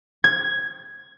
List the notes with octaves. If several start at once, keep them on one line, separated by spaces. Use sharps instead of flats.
G#6